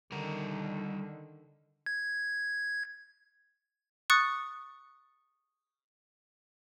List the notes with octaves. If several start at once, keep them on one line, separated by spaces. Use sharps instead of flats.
D3 D#3 G3 A#4
G#6
C#6 D#6 F#6 A6 C#7